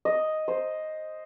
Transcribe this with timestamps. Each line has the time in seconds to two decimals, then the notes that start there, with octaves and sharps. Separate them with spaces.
0.05 D#5
0.48 C5